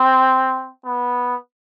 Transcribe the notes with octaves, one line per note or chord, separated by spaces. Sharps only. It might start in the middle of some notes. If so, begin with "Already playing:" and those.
Already playing: C4
B3